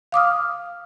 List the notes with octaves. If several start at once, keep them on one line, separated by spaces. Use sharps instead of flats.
F5 D6 D#6 F6